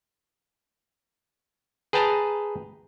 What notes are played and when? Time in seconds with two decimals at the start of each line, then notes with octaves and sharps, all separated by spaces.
1.93 G#4 B4 G5 A5 A#5